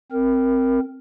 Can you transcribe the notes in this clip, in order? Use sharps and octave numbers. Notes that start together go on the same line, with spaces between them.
C4 A#4